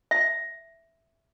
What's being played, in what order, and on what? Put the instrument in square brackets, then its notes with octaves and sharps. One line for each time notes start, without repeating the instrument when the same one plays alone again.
[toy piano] E5